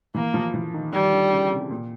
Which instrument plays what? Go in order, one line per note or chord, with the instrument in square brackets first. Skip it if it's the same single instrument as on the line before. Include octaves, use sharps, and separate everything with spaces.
[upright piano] E3 [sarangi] A#3
[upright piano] F3
E3
D#3
[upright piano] D#3 [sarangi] G3
[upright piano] D3
C#3
C3
A#2